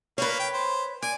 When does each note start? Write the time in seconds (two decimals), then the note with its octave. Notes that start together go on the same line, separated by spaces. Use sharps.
0.18 A#3 B4 C#5
0.39 G5
0.54 C5
1.02 D5 G#5